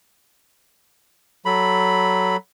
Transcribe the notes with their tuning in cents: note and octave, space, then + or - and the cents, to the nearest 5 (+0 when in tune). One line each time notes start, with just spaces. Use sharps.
F#3 +10 A4 +0 B5 +0